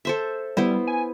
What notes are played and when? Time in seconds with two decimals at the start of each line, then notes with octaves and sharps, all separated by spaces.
0.05 A4 C5 E5
0.57 G3 B3 E4 C5
0.87 G#5